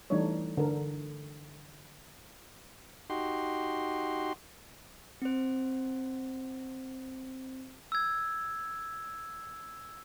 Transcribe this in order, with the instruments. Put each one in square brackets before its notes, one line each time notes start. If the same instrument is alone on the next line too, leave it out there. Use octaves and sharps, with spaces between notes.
[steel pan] E3 G3 A3 D4 D#4 C#5
D3 A4 A#4
[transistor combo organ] D#4 F#4 G4 C6
[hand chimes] C4 C5
[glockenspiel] E6 G#6